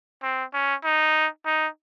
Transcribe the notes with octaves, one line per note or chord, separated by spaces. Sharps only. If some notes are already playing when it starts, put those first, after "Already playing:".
C4
C#4
D#4
D#4